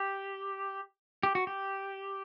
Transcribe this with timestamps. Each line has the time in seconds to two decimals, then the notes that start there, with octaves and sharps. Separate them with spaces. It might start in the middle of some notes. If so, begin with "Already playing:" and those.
Already playing: G4
1.23 G4
1.35 F#4
1.47 G4